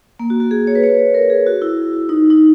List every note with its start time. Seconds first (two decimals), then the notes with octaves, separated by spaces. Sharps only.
0.19 A#3
0.30 F#4
0.40 F#4
0.51 G#4
0.67 C#5
0.75 B4
0.83 C#5
1.14 A#4
1.30 G#4
1.46 F#4
1.62 E4
2.09 D#4
2.30 D#4